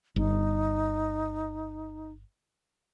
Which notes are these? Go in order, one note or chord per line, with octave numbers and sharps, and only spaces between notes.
G1 D#4